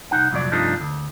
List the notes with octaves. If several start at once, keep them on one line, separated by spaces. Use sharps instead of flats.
C2 A#2 D#4 F#5
C2 F2 A#2 F3 F#3 D5
G2 C3 F3 A3 D4 D#4
D2